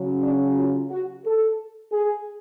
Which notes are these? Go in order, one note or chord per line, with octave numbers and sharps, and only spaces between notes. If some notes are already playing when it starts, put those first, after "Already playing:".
Already playing: C#3 F#3
D4
F4
F#4
A4
G#4